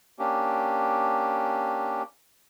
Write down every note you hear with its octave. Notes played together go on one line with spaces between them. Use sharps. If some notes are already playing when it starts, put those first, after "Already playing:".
A#3 C#4 D4 G4